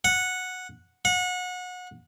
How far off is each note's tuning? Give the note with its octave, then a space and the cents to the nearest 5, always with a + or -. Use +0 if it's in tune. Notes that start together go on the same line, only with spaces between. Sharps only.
F#5 -10
F#5 -30